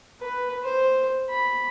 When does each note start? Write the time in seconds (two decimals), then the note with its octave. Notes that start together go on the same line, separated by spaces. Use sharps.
0.20 B4
0.63 C5
1.30 B5